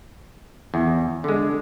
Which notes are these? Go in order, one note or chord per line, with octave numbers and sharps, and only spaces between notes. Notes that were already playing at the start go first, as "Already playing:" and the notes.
E2
D3 G#3